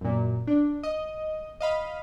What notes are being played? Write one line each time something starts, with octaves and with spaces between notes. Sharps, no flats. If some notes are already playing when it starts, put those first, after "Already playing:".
F#2 A#2
D4
D#5
D#5 F5 B5